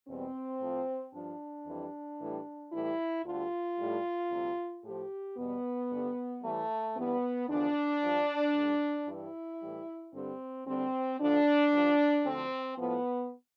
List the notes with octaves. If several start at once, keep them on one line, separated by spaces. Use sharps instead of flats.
E2 B2 G3 C4
A2 F3
G2 F3 D4
F2 E3 G3
A2 E3 G3
A2 E3 G3 E4
D2 D3 G3 F4
A2 G3
D2 C3 G3
A2 F3 G4
E2 B2 G3 B3
G2 D3 G3
A2 E3 G3 A3
G2 E3 G3 B3
E2 D3 F3 D4
G2 F3
A2 G3
G2 E3 G3 E4
A2 E3 G3
G2 D3 G3 C4
D2 D3 G3 C4
D2 D3 F3 D4
G2 F3
D2 D3 F3 C4
A2 F3 B3